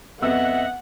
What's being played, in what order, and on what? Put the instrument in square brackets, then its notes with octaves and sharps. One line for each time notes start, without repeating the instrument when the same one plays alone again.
[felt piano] F2 B3 E6 [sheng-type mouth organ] D#5 E5 [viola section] F#5